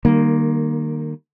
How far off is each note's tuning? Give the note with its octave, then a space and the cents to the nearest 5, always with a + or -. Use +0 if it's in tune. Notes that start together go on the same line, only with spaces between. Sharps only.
D#3 -25 G3 -5 A#3 +0